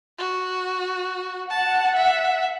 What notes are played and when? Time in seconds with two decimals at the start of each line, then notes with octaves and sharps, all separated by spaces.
0.18 F#4
1.50 F#5 A5
1.95 E5